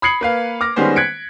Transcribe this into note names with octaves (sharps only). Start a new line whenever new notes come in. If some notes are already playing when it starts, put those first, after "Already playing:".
B5 D#6 G#6 C7 C#7 F#7
A#3 B4 F5
D6 F6 A#6
D#3 G3 G#3 B3 C#4 C5
F#6 G#6 B6 C#7 D7